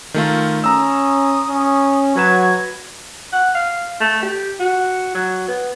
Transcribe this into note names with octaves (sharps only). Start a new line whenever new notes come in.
D#3 A3 F4
C#4 A#5 D#6 E6
C#4
F#3 F#4 B4 G#6 E7
F#5
F5
A3
G4
F#4
F#3
B3